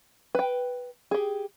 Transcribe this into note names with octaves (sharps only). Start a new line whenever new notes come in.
B4 G5
G4 G#4